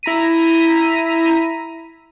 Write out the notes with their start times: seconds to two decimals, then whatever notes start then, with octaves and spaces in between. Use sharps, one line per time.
0.03 E4 A#5 B6 D#7